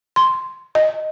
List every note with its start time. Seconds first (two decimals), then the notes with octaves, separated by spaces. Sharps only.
0.16 C6
0.75 D#5